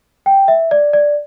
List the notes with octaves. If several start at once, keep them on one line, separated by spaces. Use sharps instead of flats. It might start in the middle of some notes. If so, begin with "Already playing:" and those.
G5
E5
D5
D5